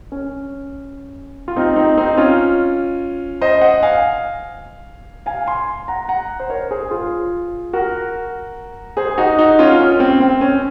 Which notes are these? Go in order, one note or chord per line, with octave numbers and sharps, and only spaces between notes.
C#4
F4
C4 D#4
C4 D#4
C4 D#4
C#4 F4
C5 D#5
D#5 F#5
F5 G#5
F5 G#5
G#5 C6
F#5 A#5
F#5 A#5
C5
A#4 C#5
G#4 C5
F4 G#4
F#4 A#4
G#4 C5
D#4 F#4
D#4 F#4
C#4 F4
C#4
C4
C4
C#4